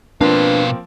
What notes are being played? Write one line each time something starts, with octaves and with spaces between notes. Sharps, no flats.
B2 F3 A#3 C4 D4 B4 F5